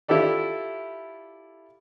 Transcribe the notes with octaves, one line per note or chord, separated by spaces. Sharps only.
E4 F4 G4 A4 D5